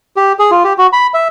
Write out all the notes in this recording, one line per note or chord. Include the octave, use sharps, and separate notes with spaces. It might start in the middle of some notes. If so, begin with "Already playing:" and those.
G4
G#4
F4
G4
F#4
B5
E5